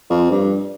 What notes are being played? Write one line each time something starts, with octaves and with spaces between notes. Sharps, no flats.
F2
G2